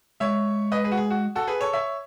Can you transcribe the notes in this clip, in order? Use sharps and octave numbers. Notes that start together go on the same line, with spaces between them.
G#3 C#5 E5
B4 D#5
G#4 B4
F#4
G#4
F#4
F#4 A4
G#4 B4
A4 C#5
C#5 E5